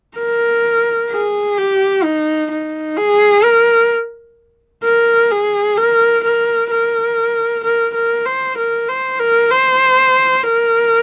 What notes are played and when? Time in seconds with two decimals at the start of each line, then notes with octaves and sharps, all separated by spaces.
0.17 A#4
1.10 G#4
1.57 G4
2.03 D#4
2.51 D#4
2.97 G#4
3.44 A#4
4.83 A#4
5.31 G#4
5.77 A#4
6.24 A#4
6.71 A#4
7.64 A#4
7.94 A#4
8.25 C5
8.57 A#4
8.88 C5
9.19 A#4
9.50 C5
10.43 A#4